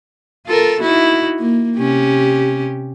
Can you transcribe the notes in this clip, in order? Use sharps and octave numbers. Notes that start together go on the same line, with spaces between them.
F4 A4 A#4
D#4 E4 F#4
A#3
C3 C#4 G4